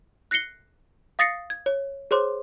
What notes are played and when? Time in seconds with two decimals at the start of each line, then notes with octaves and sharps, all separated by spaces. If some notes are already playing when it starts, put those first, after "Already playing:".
0.31 F#6 A#6 C7 C#7 G7
1.19 F5 D#6 A6 A#6 C7 C#7
1.50 G#6
1.66 C#5
2.11 G#4 C5 C#5 C6 D6